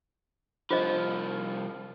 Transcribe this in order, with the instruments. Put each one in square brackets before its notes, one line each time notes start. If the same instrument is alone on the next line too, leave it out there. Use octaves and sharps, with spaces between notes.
[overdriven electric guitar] C2 F3 [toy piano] F4 C5 D#5